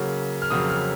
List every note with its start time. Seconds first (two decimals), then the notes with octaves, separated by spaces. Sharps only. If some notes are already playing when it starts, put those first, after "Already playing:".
Already playing: C#3 F#3 A#3
0.42 F6
0.50 F2 C#3 F#3 A#3 D#6
0.70 F6